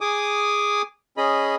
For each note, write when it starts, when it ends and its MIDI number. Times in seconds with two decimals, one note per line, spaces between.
0.01 0.82 68
0.01 0.82 80
0.01 0.82 86
0.01 0.82 87
1.17 1.56 61
1.17 1.56 68
1.17 1.56 75
1.17 1.56 83